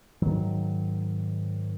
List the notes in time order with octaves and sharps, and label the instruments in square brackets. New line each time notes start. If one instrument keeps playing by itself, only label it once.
[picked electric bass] G#2 D#3 F#3